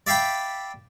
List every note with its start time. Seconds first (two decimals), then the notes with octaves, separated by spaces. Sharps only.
0.07 D5 E5 F5 G5 B5